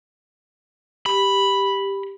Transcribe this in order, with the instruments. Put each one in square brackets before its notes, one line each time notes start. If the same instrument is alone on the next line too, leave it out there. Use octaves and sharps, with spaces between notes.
[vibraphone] G4 [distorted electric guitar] B5